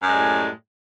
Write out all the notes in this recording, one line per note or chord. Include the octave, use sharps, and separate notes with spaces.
F#2 A2 G3 G#3